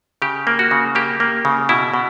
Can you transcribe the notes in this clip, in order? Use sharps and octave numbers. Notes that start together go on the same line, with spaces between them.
C#3 G4
A#3
F#4
C#3
A#3 G4
A#3
C#3
B2 E4
B2